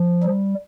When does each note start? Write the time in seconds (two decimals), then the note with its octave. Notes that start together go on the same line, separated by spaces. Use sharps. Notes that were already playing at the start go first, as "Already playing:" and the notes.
Already playing: F3
0.23 G3